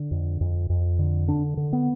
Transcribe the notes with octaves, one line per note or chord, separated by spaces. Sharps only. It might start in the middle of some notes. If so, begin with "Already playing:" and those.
Already playing: D3
F2
F2
F2
D3
D3 D4
D3
B3